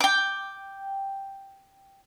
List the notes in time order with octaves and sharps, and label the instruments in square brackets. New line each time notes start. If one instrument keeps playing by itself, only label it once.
[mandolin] G5 D6